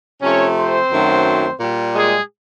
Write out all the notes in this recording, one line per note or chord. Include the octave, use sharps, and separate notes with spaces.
C3 F3 A3 C#4 C#5
C4 C5
F#2 D#3 F#3 A3
A#2 G3
G#3 G#4